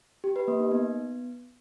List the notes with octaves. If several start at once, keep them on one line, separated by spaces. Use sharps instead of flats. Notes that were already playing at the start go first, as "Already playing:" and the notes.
G4
B4
A#3
D#4
B3